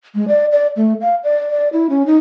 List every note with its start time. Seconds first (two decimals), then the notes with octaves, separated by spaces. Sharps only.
0.15 G#3
0.28 D5
0.52 D5
0.77 A3
1.01 F5
1.24 D5
1.50 D5
1.73 E4
1.90 C#4
2.06 D#4